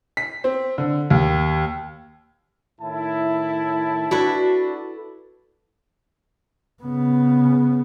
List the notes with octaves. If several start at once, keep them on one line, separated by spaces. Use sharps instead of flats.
B6
C4
D3
D#2
A2 D#3 E4 A5
D4 E4 F#4 A4 B4
C#3 B3